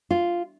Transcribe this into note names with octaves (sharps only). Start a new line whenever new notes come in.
F4